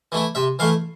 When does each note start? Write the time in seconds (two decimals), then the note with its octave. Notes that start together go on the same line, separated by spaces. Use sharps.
0.12 E3 A3 E4
0.35 C3 E5
0.59 E3 A3 E4 F5